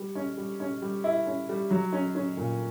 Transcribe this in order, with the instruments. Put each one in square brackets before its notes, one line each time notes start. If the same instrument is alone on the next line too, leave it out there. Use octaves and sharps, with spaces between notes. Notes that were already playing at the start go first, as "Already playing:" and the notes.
Already playing: [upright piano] G3
C#4
G3
C#4
G3
E4
C#4
G3
F#3
C#4
C#4
A#2